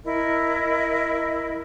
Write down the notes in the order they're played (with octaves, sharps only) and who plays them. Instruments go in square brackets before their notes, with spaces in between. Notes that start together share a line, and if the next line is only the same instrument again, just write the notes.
[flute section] E4 A#4 D#5